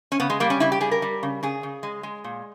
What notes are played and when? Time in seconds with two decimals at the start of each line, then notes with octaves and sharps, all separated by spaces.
0.12 C#4
0.20 C#3 B3
0.30 G#3
0.40 G3 A#3
0.50 C#4
0.60 C#3 E4
0.72 G4
0.81 G3 G#4
0.91 A#4
1.02 G3
1.23 C#3
1.43 C#3 G#4
1.63 C#3
1.83 G#3
2.03 G#3
2.24 A#2